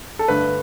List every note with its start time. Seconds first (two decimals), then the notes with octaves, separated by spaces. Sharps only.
0.19 A4
0.28 G2 D3 A3 B4